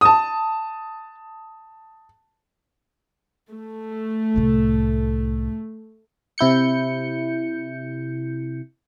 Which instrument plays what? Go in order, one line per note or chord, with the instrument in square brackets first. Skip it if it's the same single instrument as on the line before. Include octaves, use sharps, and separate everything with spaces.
[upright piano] A5 D#6
[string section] A3
[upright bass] C2 A2
[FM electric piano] C3 E4 G6 C#7